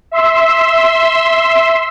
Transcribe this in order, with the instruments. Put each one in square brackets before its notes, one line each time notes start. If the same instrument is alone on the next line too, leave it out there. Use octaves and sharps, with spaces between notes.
[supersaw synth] E5 C6 E6